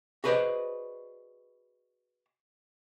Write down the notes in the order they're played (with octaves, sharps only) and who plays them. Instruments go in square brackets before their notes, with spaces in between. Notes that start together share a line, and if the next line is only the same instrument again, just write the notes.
[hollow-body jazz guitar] F#4 G#4 B4 C5 D5 D#5